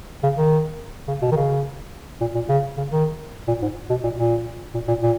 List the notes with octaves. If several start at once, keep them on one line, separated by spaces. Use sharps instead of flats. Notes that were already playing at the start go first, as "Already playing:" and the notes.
C#3
D#3
C#3
B2
D#3
C#3
A#2
A#2
C#3
C#3
D#3
A#2
G#2
B2
A#2
A#2
A#2
A#2
A#2